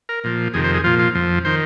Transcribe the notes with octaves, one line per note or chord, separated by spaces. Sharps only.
A#4
A#2 F3
F2 C3 D#3 G#4
C5
G#4
A#2 F3 F4
F4
F2 F3
D#3 C5